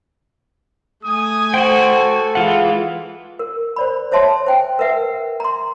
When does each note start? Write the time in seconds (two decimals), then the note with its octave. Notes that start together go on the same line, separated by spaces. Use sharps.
1.05 A3 G#5 D#6
1.54 F#4 A4 C5 F#5 G5
2.35 E3 G#3 E4 F4 F#5
3.39 A#4
3.76 C5 D5 B5
4.12 C5 C#5 E5 A5 C6
4.47 C5 G5 G#5
4.79 A#4 B4 E5 F#5
5.40 A#5 C6